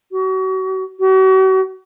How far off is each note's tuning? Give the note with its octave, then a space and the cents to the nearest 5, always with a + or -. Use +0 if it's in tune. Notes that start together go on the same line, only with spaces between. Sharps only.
F#4 +35
F#4 +40